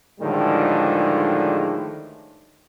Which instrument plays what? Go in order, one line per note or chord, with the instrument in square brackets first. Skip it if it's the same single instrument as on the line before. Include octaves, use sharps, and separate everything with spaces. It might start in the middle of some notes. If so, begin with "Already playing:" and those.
[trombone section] A2 D3 D#3 F3 G3 G#3